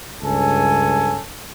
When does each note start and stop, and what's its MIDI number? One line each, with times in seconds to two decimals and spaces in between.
0.23 1.21 37
0.23 1.21 43
0.23 1.21 61
0.23 1.21 69
0.23 1.21 80